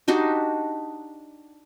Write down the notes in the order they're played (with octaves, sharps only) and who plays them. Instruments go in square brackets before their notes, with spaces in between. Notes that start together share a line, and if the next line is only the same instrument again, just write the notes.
[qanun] D4 D#4 F#4 G4